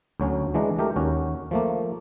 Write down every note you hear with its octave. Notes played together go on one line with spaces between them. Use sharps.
D2 F#3 C#4
E3 G#3 D4 A#5
A3 G4 A#4
D#2 C#4 F#4
F3 A3 A#3